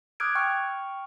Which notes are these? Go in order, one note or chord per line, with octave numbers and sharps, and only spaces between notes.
D6 D#6 F6 F#6 G#6 D7
G5 C#6 F6